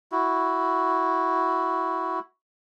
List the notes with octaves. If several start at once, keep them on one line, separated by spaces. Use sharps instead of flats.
E4 F#4